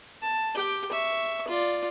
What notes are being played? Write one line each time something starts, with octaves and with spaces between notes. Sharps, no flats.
A5
G4 G5
E5 C#6
F4 D5